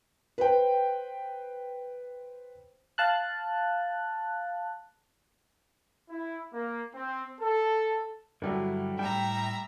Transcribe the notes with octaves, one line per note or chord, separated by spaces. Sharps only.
B4 C5 G5
F5 A5 F#6
E4
A#3
C4
A4
G2 D3 F#3 G3 A3 E4
A2 G3 E5 G5 A#5